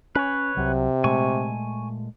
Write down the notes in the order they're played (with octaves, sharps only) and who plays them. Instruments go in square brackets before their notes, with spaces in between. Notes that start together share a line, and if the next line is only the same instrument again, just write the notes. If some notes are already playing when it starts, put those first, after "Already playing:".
[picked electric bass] C#4 [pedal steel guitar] B4 C#5
[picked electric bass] C2 F#3 [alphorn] C3
[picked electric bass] A#2 G#3 A3 [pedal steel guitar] G#5 C#6